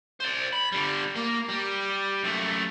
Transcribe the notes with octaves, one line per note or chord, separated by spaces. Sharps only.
C5 D5
B5
D3 G3
A#3
G3
F#2 A3